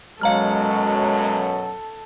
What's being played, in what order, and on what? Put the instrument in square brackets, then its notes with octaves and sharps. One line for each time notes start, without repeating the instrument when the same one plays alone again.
[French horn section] F#2 B2 F#3 [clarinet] G#3 [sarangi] A4 [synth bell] F5 A#5 F6